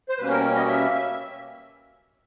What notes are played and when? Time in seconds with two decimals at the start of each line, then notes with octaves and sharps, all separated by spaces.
0.09 C5
0.18 B2 G3 A#3 C#4 B4
0.31 A#4
0.55 D#5
0.68 E5